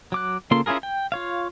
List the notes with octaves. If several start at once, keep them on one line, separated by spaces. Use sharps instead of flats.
F#3 D6 F#6
C#3 A#3 F4 A4 C6
C#4 E4 F4 G#4 A#4
G5
F4 C#5 F5